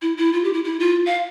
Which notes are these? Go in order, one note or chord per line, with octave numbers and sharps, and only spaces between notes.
E4
E4
F4
G4
E4
E4
F4
F5